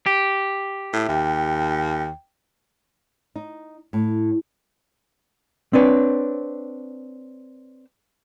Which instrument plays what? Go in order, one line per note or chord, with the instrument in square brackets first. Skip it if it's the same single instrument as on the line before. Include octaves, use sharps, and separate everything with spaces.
[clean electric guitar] G4
[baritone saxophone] A2 [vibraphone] E5
[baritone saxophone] D#2 [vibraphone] G5
[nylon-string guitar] D#4
A2
[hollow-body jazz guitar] C4 D4 B4 C#5